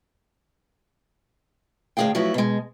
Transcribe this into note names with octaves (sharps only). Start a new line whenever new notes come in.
D2 A2 F#3 G#4 F5 G5
F3 F#3 A3 E4 B4
B2 G#3